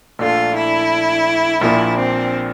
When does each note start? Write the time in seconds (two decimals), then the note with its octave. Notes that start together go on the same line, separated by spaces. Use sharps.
0.19 A#1 A#2 A3 D4 F4 A4
0.55 E4
1.61 A#1 A#2 F3 A#3 D4 E4
1.97 C4